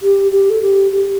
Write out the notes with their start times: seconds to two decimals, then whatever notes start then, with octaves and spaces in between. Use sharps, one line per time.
0.02 G4
0.32 G4
0.50 A4
0.62 G4
0.91 G4